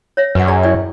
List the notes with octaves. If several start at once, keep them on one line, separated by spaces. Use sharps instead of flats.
C#5 E5
F#2 B4 F#5
G#4 D5 A#5
E4 D5 G5